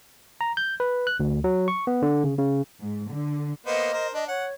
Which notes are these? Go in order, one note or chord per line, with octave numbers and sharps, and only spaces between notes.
A#5
G6
B4
F#6
D2
F#3
C#6
B3
D3
C#3
C#3
G#2
D3
A#3 B3 C5 D#5
A#4 C5
D4 D#5
C#5 F#5